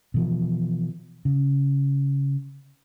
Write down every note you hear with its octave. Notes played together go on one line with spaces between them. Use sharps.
B2 E3 F3
C#3